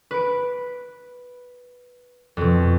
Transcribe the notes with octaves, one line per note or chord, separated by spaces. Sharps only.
B4 D7
F2 B2